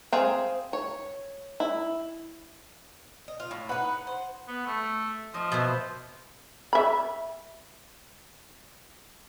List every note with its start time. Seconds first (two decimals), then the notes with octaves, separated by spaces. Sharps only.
0.12 C4 G#4 F5
0.73 C#5
1.60 E4
3.28 D#5
3.40 F4
3.51 A2
3.69 D#4 B4 F#5
4.07 C5
4.48 B3
4.66 A3
5.34 F3 D#5
5.52 B2 C5 E5
6.73 E5 B5